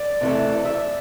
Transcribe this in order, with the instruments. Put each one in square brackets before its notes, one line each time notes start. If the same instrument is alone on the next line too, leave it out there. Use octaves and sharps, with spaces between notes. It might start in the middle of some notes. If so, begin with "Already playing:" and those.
Already playing: [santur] D5
[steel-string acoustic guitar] C3 E3 A3
[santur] E5